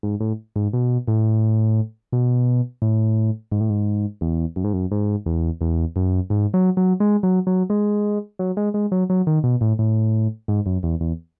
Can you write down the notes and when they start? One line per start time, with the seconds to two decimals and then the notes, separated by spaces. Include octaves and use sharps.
0.03 G#2
0.20 A2
0.56 G#2
0.73 B2
1.08 A2
2.12 B2
2.82 A2
3.52 G#2
3.61 A2
3.70 G#2
4.21 E2
4.56 F#2
4.64 G#2
4.73 F#2
4.91 G#2
5.26 E2
5.61 E2
5.96 F#2
6.30 G#2
6.54 F#3
6.77 F#3
7.00 G#3
7.23 F#3
7.47 F#3
7.70 G#3
8.39 F#3
8.57 G#3
8.74 G#3
8.92 F#3
9.10 F#3
9.27 D#3
9.44 B2
9.61 A2
9.79 A2
10.48 G#2
10.66 F#2
10.83 E2
11.00 E2